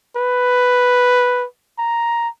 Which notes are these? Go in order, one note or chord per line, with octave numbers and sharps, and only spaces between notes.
B4
A#5